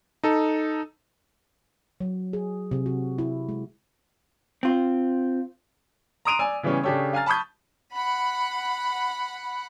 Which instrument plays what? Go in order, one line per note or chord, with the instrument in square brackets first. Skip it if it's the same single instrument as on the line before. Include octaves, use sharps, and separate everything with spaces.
[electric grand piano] D#4 A4
[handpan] F#3
G#4
C3
F#4
E4
G#3
[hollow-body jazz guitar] C4 F4
[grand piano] A#5 C6 D#6 D7 D#7 F7
D5 G#5 E6
C#3 E3 G3 B3 C#4
C#3 D4 G4 A4 C#5
F5 G#5 A#5 F6 A6
A5 B5 C#6 D#6 G6
[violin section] F#5 B5